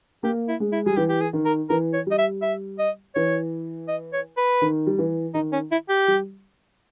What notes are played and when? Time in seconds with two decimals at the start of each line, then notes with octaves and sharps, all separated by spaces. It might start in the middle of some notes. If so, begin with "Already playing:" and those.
0.23 A#3 G4
0.48 E4
0.60 G#3
0.72 E4
0.86 G3 G#4
0.96 E3 G4
1.09 G4
1.21 G#4
1.33 D#3
1.45 A#4
1.70 E3 A#4
1.93 C#5
2.07 G3 D#5
2.18 E5
2.42 E5
2.79 D#5
3.15 E3 C#5
3.88 D#5
4.13 C#5
4.37 B4
4.61 D#3
4.87 G3
4.98 E3
5.34 D#3 D#4
5.53 C#4
5.71 E4
5.89 G4
6.08 G3